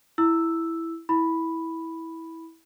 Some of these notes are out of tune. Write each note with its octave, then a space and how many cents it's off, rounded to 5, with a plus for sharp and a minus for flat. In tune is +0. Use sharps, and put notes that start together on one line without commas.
E4 +0 E6 +0
E4 -15 B5 +0